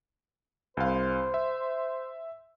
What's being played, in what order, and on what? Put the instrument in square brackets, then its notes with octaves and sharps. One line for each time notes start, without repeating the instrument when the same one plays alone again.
[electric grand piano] C2 F5 [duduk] C5
[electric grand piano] E5